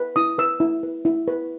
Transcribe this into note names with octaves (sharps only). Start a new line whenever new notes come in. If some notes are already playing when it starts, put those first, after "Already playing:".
Already playing: B4
E4 D#6
B4 E6
E4
B4
E4
B4